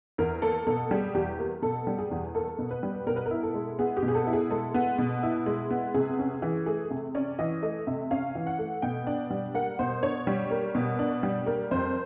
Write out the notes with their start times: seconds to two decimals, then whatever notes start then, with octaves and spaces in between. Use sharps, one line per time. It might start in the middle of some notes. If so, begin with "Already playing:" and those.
0.18 E2 A#4
0.42 A#3 A4
0.67 B2 A4
0.91 G3 G#4
1.14 E2 G4
1.39 A#3
1.62 B2 A4
1.87 G3
1.98 G#4
2.11 E2
2.35 A#3 A4
2.59 B2
2.71 B4
2.83 G3
3.07 B2 A#4
3.16 B4
3.26 A#4
3.31 E4
3.43 A4
3.54 G#3
3.79 B3 G#4
3.97 G4
4.02 B2
4.08 G#4
4.15 A4
4.27 E4
4.33 G#4
4.50 G#3 A4
4.74 B3
4.98 B2
5.23 E4
5.46 G#3
5.70 B3
5.94 C3 G#4
6.19 C#4
6.42 E3
6.66 A3 G#4
6.90 C3
7.15 C#4 D5
7.39 E3 D#5
7.63 A3 D#5
7.87 C3 E5
8.11 C#4 F5
8.35 E3
8.47 F#5
8.59 A3
8.82 B2 G5
9.07 D4
9.30 G3
9.54 A#3 F#5
9.79 B2 C5
10.03 D4 C#5
10.27 G3
10.51 A#3
10.75 B2
10.99 D4
11.23 G3
11.47 A#3
11.71 F2 C5